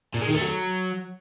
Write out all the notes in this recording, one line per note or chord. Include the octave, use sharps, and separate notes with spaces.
A#2
G#3
D#3
A3
F#3